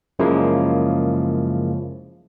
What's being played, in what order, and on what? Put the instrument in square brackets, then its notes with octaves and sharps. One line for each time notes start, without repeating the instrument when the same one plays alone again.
[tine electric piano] F#2 C#3 F3 G#3 A#3 E4